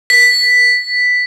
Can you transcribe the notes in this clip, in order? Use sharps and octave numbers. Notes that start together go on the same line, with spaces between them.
B6